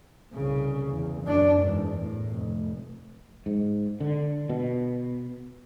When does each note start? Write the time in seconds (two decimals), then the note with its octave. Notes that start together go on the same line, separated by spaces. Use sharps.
0.33 C2 C#3
0.89 E2
1.23 F#2 D4
1.62 E2 G#2
2.00 A2
2.30 F1
3.46 G#2
4.00 D3
4.49 B2